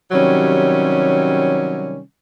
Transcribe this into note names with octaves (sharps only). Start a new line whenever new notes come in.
C3 D#3 F#3 G3 C#4